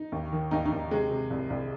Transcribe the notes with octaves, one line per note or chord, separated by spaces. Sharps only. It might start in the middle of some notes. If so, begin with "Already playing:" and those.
Already playing: D#4
D#2
D#3
D#2 D#4
D#4
D#2
C3 G#3
C3
C2
C2